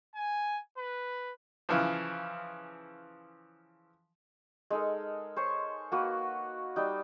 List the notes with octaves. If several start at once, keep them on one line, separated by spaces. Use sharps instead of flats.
G#5
B4
C#3 E3 F3
G#3 D#4 A4 A#4
C5 C#5 C6 C#6
A#3 F#4 B4
G3 D#4